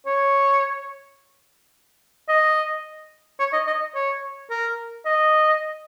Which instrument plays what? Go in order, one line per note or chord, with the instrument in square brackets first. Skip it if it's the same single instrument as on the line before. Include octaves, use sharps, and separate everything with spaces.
[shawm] C#5
D#5
C#5
D#5
D#5
C#5
A#4
D#5